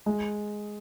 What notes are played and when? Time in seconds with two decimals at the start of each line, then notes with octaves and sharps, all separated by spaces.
0.06 G#3